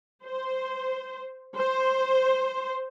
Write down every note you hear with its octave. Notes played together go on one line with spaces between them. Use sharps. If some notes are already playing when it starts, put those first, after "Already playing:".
C5
C5